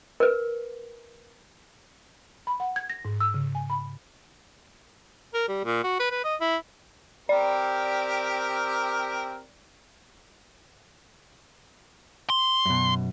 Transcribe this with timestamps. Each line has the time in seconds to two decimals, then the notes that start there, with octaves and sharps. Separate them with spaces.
0.20 A#4 B4
2.47 B5
2.60 F#5
2.76 G#6
2.90 A#6
3.05 G#2
3.20 E6
3.34 C#3
3.55 G#5
3.70 B5
5.34 A#4
5.48 G3
5.65 A#2
5.84 F#4
6.00 B4
6.11 B4
6.24 D#5
6.41 E4
7.29 C4 G4 A#4 D5
12.30 C6
12.65 F#2 B2